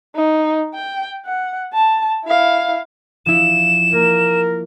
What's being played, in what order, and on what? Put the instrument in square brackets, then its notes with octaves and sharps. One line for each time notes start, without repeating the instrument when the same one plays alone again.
[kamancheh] D#4
G5
F#5
A5
E4 F5
[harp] F3 E4 [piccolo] E7
[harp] A#3 [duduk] A#4